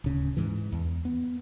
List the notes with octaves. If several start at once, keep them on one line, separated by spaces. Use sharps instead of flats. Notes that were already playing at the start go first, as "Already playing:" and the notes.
D1 C#3
G#2 E3
E2
B3